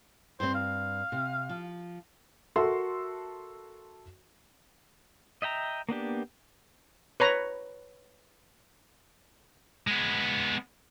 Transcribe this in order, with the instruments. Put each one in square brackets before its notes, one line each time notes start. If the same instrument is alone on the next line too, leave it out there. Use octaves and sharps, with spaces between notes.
[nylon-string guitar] G2 C4 [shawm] C5
[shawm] F5
[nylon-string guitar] C3
F3
[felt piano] F#4 A4 A#4 E5 C6
[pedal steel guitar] D#5 E5 G5 A#5
A#3 B3 D4 G4
[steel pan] B4 C#5 A#5
[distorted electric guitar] G#3 B3